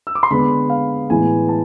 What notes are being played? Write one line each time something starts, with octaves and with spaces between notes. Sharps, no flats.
E6
D6
C6
D3 G#3 B3 B5
F5
A2 E3 G#3 B3 G#5
A5